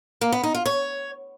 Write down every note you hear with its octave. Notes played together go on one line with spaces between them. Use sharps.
A#3
B3
D#4
F4
C#5